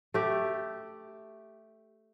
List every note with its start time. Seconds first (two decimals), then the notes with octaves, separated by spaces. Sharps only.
0.14 A3 G4